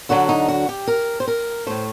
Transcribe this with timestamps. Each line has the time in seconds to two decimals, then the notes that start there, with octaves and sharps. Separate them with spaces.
0.09 D2 D3 F#3 F#4
0.29 D#4
0.48 F#4
0.69 G4
0.87 A#4
1.20 C5
1.27 A#4
1.67 A2 A3 C5